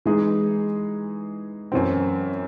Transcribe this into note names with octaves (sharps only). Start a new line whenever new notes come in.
E3 G#3 D#4 G#4
F#2 E3 C4